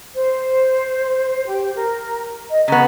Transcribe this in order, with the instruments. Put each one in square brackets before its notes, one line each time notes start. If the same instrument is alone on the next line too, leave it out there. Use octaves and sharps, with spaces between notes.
[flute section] C5
G4
A#4
D#5
[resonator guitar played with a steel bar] C#3 B3 [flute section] A#5